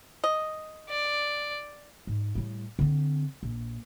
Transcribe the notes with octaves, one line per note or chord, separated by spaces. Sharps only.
D#5
D5
G#2
A2 G3
D3 C4
A#1